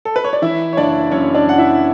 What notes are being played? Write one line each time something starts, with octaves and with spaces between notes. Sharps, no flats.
A4
B4
C#5
D5
E3 E4 E5
C#5
F#1 D4 D5
F#2 C#4 C#5
D4 D5
F#1 F#5
E4 E5